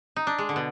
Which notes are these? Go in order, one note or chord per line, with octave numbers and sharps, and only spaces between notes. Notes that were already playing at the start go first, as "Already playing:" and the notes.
D#4
D4
G#3
D3
B2